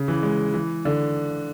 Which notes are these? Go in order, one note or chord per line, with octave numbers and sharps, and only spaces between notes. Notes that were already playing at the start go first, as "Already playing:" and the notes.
Already playing: C#3
E3
G#3
E3
D3